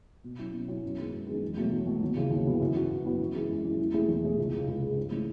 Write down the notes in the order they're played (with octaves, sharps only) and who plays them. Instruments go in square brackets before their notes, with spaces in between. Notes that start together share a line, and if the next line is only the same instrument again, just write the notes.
[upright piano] B2
F#3 C#4 E4
B2
F#3 C#4 E4
F#2
D#3 G#3 B3
F#2
D#3 G#3 B3
E2
B2 F#3 A3
E2
B2 F#3 A3
D#2
C#3 E3 B3 F#4
D#2
C#3 E3 B3 F#4
F#2
E3 B3 F#4
F#2
E3 B3 F#4
F#2
E3 G#3
F#2
E3 G#3
E2
B2 A3 E4 G#4
E2
B2 A3 E4 G#4
C#2
C#3 G#3
C#2
C#3 G#3
G#2
E3 A3 C#4